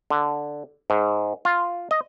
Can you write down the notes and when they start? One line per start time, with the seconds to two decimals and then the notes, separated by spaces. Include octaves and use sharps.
0.10 D3
0.90 G#2
1.45 F4
1.91 D#5